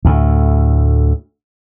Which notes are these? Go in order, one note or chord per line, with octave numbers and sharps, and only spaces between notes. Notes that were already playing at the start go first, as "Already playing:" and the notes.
D2 A2